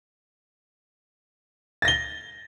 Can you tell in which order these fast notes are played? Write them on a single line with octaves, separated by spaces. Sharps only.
A6 A#6 G7